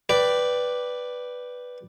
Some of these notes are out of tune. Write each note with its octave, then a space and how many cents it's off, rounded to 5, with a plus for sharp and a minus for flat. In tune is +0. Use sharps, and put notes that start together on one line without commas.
B4 +0 D5 +0 G5 -5